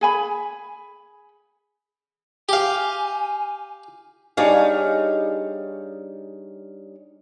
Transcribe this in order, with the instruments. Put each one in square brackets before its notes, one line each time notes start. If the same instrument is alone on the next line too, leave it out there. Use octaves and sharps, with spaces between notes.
[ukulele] G#4 G#5 B5
[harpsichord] G4 F5 [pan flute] G#5
[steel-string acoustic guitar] G3 D4 D#4 G#4 C#5 F5